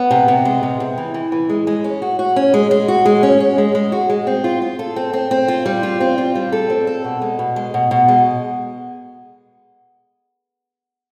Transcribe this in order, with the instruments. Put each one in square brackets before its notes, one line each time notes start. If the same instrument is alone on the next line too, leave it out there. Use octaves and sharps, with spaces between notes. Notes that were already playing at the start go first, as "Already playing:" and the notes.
Already playing: [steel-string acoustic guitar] B3
C3
C3
G#3
C3
C3
E3
E3
E3
G#3
G#3
C#4
F#4
F#4
C#4
G#3
G#3
F#4
G#3
C#4
C#4
G#3
G#3
F#4
G#3
C4
F4
F4
A4
C4
C4
C4
F4
G3
F4
C4
F4
G3
A4
C4
A4
B2
G#3
B2
G#3
B2
B2
G#3